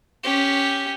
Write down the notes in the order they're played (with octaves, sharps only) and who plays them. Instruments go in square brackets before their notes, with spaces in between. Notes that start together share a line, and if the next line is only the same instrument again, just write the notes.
[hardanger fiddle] C#4 G4